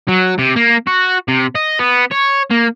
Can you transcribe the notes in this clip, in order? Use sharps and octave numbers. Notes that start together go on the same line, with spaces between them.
F#3
C3
A#3
F#4
C3
D#5
B3
C#5
A#3